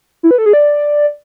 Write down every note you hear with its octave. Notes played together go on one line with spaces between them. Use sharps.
E4
B4
A4
G#4
D5